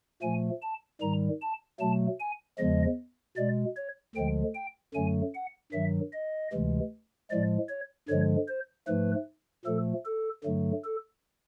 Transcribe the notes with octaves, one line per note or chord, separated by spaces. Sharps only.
A#2 F3 A3 G#5
A5
G#2 D#3 G3 A#5
A5
B2 F#3 A3 A5
G#5
E2 C#3 F3 G#3 D#5
B2 G#3 D5
C#5
D2 D3 F3 G#3 G5
G5
F#2 D3 F#3 A3 G#5
F#5
G2 D#3 F#3 E5
D#5
D2 C3 E3 G#3
A2 F3 G#3 D5
C#5
G2 D3 F3 G#3 C#5
C5
G#2 F3 A3 B4
A#2 F3 A3 A4
A4
G2 D3 F#3 A3
A4